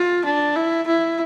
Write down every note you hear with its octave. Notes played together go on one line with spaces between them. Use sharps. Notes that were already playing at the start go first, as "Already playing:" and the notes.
Already playing: F4
D4
E4
E4